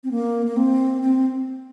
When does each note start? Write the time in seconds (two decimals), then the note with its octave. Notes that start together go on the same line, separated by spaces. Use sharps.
0.04 C4
0.11 A#3
0.46 A#3
0.57 C4
1.02 C4